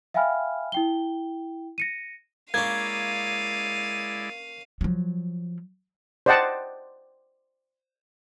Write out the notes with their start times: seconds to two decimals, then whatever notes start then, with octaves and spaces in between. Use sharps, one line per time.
0.14 E5 F5 G5 G#5 B5 F6
0.72 E4 G5 G7
1.78 A#6 C#7 D#7
2.54 G#3 A#3 C#4 E4 D5 F5 G#6 D#7
4.81 F3 F#3
6.26 C5 D5 D#5 F#5 G5 A5